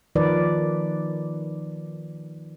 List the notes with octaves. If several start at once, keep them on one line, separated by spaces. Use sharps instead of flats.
D#3 F3 A#4 B4 D5